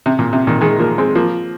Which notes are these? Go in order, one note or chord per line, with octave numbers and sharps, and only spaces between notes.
C3
A#2
C3
A#2 D#3
D#3 G#3
F3 A#3
G#3 C4
F3 A#3